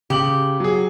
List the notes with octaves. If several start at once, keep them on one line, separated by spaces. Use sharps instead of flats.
C#3 G4 F#7
F#3 G#4